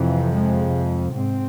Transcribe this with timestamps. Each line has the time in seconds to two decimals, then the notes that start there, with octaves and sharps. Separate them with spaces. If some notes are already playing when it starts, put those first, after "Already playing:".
Already playing: F2 C3 E3
0.32 G#3
1.13 G#2 C4